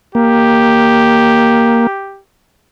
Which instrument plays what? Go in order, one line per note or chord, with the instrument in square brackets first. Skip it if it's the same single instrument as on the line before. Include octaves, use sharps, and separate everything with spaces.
[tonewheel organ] A#3 [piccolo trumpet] G4